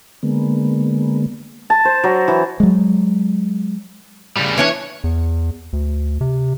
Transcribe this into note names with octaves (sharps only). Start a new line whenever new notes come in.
D3 G#3 A#3 B3
A5
C5
F#3
E3
F#3 G#3
C#3 G3
E3 C#4 D4 C#5
E2
D2
C3